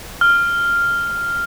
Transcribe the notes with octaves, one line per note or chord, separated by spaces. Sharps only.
F6